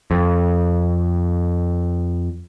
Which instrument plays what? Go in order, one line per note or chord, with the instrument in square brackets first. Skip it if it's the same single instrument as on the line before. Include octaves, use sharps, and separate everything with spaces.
[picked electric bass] F2